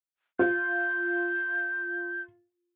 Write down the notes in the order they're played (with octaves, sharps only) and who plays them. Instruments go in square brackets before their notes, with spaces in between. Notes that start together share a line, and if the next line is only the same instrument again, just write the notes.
[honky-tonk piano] F4 [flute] G6